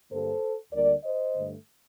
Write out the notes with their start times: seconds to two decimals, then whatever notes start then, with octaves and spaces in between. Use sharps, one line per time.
0.11 G2 D3 G3 A#3 A4 C5
0.72 D2 D3 G3 A#3 A#4 D5
1.03 C5 D#5
1.35 G2 D3 A3